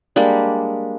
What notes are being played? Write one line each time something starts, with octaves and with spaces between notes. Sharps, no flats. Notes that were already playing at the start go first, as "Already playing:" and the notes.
G3 G#3 A#3 D4